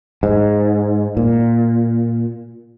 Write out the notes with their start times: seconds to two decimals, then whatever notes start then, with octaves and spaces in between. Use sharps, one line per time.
0.23 G#2
1.17 A#2